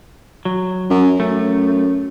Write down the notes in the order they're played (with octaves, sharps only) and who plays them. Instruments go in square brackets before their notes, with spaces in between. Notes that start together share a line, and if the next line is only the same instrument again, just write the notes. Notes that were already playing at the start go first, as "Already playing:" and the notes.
[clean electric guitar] F#3
[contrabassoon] F#2
[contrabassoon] F#2 [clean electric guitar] A3